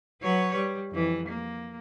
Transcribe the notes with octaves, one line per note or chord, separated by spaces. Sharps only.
F#3 B4 C#5
G3
F2 E3
A#3